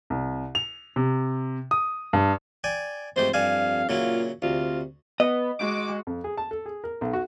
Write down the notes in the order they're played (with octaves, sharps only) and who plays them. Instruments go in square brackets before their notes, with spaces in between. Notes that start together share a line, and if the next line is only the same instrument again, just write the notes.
[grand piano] C2
F7
C3
D#6
G2
[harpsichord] D5 G5 G#5
[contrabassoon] F2 [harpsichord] G#2 A3 G4 [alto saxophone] C5
[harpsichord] G2 G3 G#5 [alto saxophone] F5
[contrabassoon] A#2 [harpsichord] C#3 F#3 E4 [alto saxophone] F4
[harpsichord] D2 [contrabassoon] C3 [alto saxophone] F4
[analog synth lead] B3 [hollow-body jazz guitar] D#5
[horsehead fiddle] G#3 F#4 [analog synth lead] D6
[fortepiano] F2
G#4
A5
A4
G#4
A#4
B1
F#4